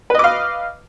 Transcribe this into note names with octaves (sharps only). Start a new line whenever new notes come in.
B4 D#5 F5 D6